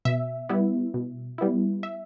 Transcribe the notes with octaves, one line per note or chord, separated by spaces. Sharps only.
B2 E5
G3 B3 E4
B2
G3 B3 E4
E5